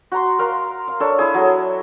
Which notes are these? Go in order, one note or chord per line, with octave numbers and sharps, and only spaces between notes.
F#4 A#5 C6
A#4 F5 C6
F5
D4 A4 C#5
E4 G#4
F#3 A4